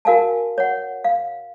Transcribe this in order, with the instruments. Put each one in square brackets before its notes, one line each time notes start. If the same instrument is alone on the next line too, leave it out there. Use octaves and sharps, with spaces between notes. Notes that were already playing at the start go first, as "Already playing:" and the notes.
[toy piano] F#4 A#4 F5 G#5 A5
C#5 F#5
F5